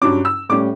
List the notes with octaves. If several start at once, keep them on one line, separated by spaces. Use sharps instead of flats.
G2 F#3 C#4 D6
E6
A2 G3 C#4 D6